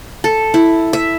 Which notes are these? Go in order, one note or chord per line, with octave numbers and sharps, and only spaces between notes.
A4
E4
E5